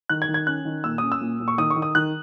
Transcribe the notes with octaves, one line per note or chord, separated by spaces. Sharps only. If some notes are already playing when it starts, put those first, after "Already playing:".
D#3 F#6
G#6
D#3
G#6
C#4 F#6
D#3
A#2 E6
C#4 D#6
E6
A#2
A#2
C#6
D#3 D#6
C#6
D#3
D#6
D#3 F#6